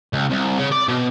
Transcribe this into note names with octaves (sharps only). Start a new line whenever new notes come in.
C#2
C2
C#3
D5
B2